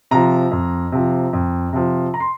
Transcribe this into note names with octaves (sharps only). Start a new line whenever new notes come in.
C3 F3 A#5
F2
C3 F3
F2
C3 F3
A#5
C6